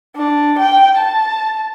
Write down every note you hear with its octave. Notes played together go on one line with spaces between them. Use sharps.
D4
G5
A5